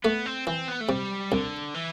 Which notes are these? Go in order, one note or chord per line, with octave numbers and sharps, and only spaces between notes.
A3 B3
C4
E3 C4
B3
A3
C3 G3
C2 D3
E3